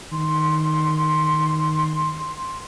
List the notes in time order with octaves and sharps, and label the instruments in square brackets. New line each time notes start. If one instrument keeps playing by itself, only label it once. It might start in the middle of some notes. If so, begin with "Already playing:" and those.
[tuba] D#3 [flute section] C6